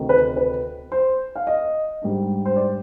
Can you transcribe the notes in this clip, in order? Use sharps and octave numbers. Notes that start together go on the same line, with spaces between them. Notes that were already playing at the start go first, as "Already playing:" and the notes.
Already playing: D2 C3 D#3
B4
B4
C5
F5
D#5
G#2 G3 D4
C5
D5